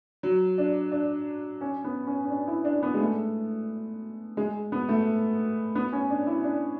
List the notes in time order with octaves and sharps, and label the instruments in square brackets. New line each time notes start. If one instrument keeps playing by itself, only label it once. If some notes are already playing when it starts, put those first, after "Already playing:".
[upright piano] F#3
D4
D4
C#4
B3
C#4
C#4
D4
E4
D4
B3
G#3
A3
G#3
B3
A3
B3
C#4
D4
E4
D4